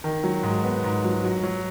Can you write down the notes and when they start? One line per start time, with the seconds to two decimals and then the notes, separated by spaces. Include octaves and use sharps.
0.04 D#3
0.24 F#3
0.43 G#2
0.64 B3
0.84 G#2
1.04 F#3
1.24 F#3
1.43 F#3